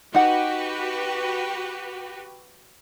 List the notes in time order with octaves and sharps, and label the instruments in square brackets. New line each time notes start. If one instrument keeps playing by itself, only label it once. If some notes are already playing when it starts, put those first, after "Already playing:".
[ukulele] D#4 F#5 [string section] F#4 G4 B4